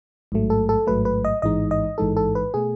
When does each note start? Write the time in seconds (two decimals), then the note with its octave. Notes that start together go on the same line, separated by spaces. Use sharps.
0.32 A1 G#2 F#3 A3
0.50 A4
0.69 A4
0.87 A1 G#2 F#3 A3 B4
1.05 B4
1.25 D#5
1.42 A1 G#2 E3 G#3 D#4 D#5
1.71 D#5
1.98 A1 G#2 E3 G#3 D#4 A4
2.17 A4
2.35 B4
2.54 B2 A3 G#4